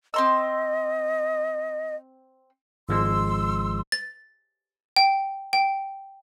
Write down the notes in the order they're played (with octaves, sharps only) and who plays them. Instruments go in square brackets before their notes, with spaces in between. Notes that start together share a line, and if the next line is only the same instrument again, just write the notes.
[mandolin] C4 C6 E6 [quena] D#5
[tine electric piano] G#1 F3 G#3 [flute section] C6 E6
[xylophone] A6
G5
G5